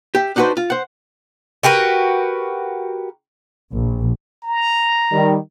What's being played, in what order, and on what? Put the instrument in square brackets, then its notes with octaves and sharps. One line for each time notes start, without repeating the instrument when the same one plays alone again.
[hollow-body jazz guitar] G4 E5
D4 D#4 F#4 G4 B4 C5
F4
C5 F#5
[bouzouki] F#4 G4 A#4 B4
[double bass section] A#1
[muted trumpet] A#5
[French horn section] D#3 G3